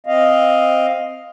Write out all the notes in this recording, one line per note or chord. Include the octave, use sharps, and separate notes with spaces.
C4 D#5 F5